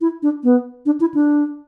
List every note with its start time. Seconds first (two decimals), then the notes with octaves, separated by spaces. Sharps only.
0.01 E4
0.23 D4
0.44 B3
0.86 D4
1.01 E4
1.14 D4